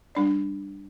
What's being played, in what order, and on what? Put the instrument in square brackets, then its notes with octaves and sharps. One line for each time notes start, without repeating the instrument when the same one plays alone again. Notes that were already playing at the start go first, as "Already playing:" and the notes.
[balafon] G3 D4 D5